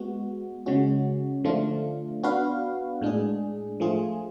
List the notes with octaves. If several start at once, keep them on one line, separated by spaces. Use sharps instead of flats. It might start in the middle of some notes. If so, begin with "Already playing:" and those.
Already playing: G#3 B3 F#4
C#3 G#3 C#4 F#4
D3 F3 A3 D4 F4
B3 D4 F#4 B4 F5
A2 G#3 D4 G#4
F3 A3 F4 G#4